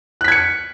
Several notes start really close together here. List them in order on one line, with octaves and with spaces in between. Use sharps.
F#6 B6 G#6 C#7